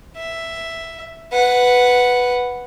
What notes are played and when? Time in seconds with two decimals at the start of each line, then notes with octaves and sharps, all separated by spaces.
0.17 E5
1.32 B4 F#5